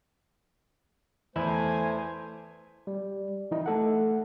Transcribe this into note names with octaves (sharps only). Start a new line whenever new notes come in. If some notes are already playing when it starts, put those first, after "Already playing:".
E2 A3 E4 C5 G#5
G3
E3 D#4 E4 D#5
A3 A4 F#5